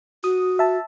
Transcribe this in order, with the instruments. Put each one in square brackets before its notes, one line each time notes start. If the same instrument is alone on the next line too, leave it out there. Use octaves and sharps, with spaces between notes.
[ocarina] F#4 [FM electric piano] D#6
[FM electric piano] E5 A5